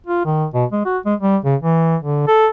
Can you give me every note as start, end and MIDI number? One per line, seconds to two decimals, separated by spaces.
0.07 0.23 65
0.25 0.46 51
0.54 0.65 47
0.72 0.83 56
0.86 0.98 66
1.05 1.14 56
1.20 1.37 55
1.45 1.56 49
1.62 1.96 52
2.03 2.26 50
2.27 2.49 69